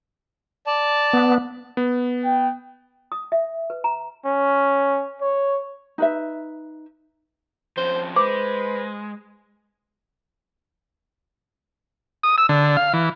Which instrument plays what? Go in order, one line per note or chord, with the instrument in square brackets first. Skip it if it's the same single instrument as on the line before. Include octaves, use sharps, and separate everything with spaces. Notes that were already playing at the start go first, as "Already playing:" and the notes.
[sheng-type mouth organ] D5 A5
[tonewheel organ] B3
[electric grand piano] B3
[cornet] G5
[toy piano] D#6
E5
B4
A#5
[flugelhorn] C#4
C#5
[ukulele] D#4 B4 E5
[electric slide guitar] F3 C4 C#4 [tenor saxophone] C5
[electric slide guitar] G#3 [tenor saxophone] B4 [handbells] C5 [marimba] D6
[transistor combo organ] D#6
E6
D3
F5
E3